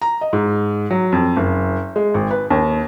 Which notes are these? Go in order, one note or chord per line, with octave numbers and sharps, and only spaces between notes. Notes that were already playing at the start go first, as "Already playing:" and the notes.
A#5
D#5
G#2
F#3
F2
F#1
G#3
G#1
B4
D#2